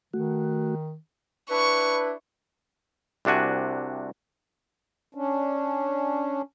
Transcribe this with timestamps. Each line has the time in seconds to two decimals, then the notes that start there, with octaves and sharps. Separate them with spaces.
0.13 D#3 A3 F#4
1.50 D4 E4 B4 C#6
3.25 C2 C3 D4 F#4 G#5
5.15 C#4 D4